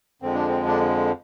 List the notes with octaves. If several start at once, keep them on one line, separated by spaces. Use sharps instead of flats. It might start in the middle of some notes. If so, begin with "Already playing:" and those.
F2 D3 F3 G#3 C4
D4
C4
D4